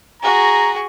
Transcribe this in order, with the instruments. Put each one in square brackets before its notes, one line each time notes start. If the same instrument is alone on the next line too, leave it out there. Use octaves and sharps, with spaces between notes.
[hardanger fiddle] F#4 G#4 [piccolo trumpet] A#5